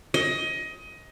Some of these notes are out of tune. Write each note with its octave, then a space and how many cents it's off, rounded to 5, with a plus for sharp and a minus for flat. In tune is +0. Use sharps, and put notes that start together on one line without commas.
D#5 +20